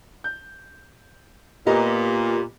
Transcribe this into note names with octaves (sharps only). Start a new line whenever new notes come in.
G6
A#2 B3 G4 D#5 A#5